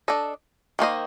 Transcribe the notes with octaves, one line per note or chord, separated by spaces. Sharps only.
D4 A4 D#5
D#3 A#3 F4 C5 D#5